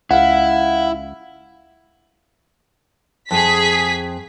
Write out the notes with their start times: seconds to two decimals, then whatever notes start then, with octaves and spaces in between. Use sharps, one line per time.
0.11 C#2 E4 F5 F#5
3.31 F2 G#4 B6